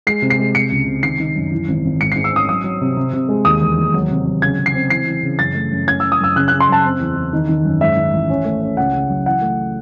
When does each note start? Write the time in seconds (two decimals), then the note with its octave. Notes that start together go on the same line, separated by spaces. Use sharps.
0.07 G#3 C7
0.22 C3
0.30 C7
0.39 G#3
0.55 C3 C#7
0.72 C#2
0.87 C3
1.03 D#3 C7
1.20 D#3
1.35 F#2
1.51 E3
1.68 G#1
1.85 G#1
2.00 G#2 C#7
2.12 C7
2.16 G#2
2.24 E6
2.32 C#4 D#6
2.49 F#3 D#6
2.64 F#3
2.81 C3
2.97 C3
3.13 C3
3.29 G#3
3.45 D#2 D#6
3.61 E1
3.78 D#2
3.94 F#3
4.10 C3
4.25 F#3
4.42 C#3 G#6
4.59 C#3
4.66 C7
4.74 C4
4.90 E3 C7
5.07 E3
5.23 C#3
5.39 F#2 A6
5.55 A3
5.71 F#2
5.87 C#4 G#6
6.00 C#4 E6
6.12 D#6
6.20 F#2 E6
6.36 C#3 F#6
6.48 F#6
6.52 C#3
6.60 C6
6.68 F#2 A5
6.85 C4
7.00 E2
7.17 E2
7.33 D#3
7.49 D#3
7.65 F#2
7.81 G#2 E5
7.97 D#3
8.13 A1
8.29 C#4
8.45 A3
8.61 C#4
8.77 C#2 F#5
8.93 C#3
9.09 F#3
9.26 E3 F#5
9.42 A3